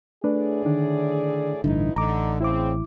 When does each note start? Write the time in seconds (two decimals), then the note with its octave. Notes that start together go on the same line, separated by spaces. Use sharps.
0.24 A2 A3 D4 G#4 B4 D5
0.65 D3 D#3 D4
1.64 A1 G2 B2 D3 D#4 E4
1.96 A1 D3 D#4 A#5 D6
2.41 C#3 C4 E4 D6